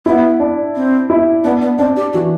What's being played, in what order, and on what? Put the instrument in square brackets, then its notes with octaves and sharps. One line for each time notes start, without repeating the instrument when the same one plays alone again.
[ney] B3 [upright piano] E4
[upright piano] D4
[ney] C4
[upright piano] E4
[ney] B3 [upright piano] D4
[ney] B3
[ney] C4 [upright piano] D4
[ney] G4
[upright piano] E3 [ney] F#4